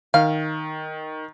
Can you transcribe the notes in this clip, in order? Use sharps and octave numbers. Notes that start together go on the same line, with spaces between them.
D#3 F5